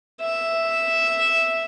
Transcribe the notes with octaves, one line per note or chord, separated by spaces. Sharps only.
E5